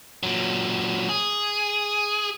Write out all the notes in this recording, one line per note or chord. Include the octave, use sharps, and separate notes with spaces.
A#2 F#3
G#4